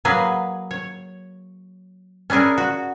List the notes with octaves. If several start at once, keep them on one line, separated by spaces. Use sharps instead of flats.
F#3 A#3 G#4 B4
C#5
C#4 D4 E4 G#4 A#4
F#4